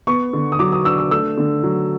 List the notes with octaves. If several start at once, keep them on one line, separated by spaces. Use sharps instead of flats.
B3 C#6
D3
D#6
F#3 D6
D#6
D4 E6
E6
A3 E6
D3
F#3